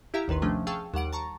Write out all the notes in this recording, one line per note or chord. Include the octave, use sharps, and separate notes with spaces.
E4 G4 E5 F5 A#5
A1 D#2 D#3 B4 C6
C3 F3 A3 C#4 D4
G#4 F5 G5 A5 C#6 E6
D#2 G3 F#5 D7
A5 A#5 C#6